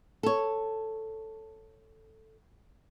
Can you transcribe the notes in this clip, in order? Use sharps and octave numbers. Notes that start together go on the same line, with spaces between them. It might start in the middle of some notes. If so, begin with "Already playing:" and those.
A4 C#5